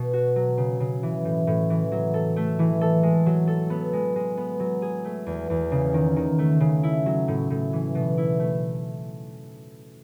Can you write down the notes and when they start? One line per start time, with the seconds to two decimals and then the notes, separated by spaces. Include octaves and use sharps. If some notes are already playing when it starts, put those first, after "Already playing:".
Already playing: B2
0.13 F#4
0.36 F#3
0.57 C#3
0.80 C#3
1.03 E3
1.25 A2
1.47 A2
1.70 E3
1.92 F#3
2.14 A4
2.36 A3
2.59 E3
2.81 A4
3.03 G#3
3.26 F#3
3.48 A4
3.70 B3
3.93 G#3
4.16 G#3
4.37 B3
4.60 F#3
4.82 G#4
5.04 A3
5.26 E2
5.50 E2
5.72 C#3
5.94 D#3
6.16 D#3
6.39 A3
6.60 C#3
6.83 E4
7.06 F#3
7.28 A2
7.50 A2
7.73 E3
7.95 B2
8.18 E4
8.39 A3